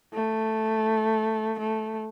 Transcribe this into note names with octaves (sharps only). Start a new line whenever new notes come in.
A3
A3